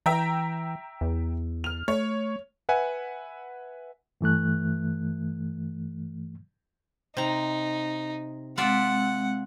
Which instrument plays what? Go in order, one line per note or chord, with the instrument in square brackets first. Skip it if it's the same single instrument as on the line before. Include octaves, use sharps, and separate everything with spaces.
[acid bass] E3 [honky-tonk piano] E5 G5 A#5
[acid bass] E2
[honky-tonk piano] F6 F7
[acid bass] A3 [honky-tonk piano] C#5
[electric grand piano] B4 E5 F#5 G#5
[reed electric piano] G2 E3 A3 F#6
[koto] C3 A#5 [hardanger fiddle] D#4
[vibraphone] G#3 C4 [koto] F4 D5 E5 [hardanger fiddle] F#5